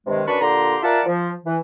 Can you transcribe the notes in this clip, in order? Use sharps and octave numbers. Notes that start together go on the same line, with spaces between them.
G2 C3 D#3 G#3
F#2 D4 B4 A5 B5 C#6
A#2 D3 G4 A#5 C6
F4 A#4 D5 E5 F#5 A5
F3
E3